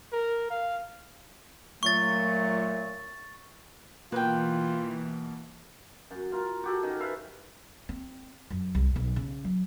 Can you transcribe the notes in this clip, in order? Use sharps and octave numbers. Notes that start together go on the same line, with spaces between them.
A#4
F5
A#2 F#3 A3 C#6 A6
B2 E3 A#3 F4 B4 G5
F#2
F4 A#4
F#4 G4 A4
D#3 C#4
B4 E5 F5
C4
F#2
C2
B1
C#3
F#3